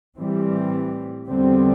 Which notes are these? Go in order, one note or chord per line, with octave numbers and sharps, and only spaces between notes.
A2 E3 G3 C4
E2 D3 G3 C4